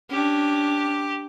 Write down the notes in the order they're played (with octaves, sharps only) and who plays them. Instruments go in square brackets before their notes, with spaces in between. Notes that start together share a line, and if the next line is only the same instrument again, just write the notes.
[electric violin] C#4 D4 [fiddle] G4